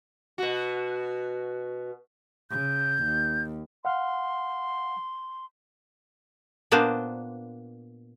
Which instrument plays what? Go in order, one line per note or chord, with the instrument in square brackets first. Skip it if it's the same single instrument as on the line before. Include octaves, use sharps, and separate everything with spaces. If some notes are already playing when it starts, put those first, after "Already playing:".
[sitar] B2 F#4
[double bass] C#3 [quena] G6
[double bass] D#2
[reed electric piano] F5 F#5 F6 [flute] C6
[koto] A#2 A#3 B3 D4 C5